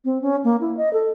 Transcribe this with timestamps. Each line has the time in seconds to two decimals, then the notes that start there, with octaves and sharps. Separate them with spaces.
0.05 C4
0.22 C#4
0.44 A#3
0.61 E4
0.77 D#5
0.93 A4